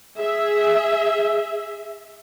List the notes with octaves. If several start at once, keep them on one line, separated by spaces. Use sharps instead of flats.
G#4 E5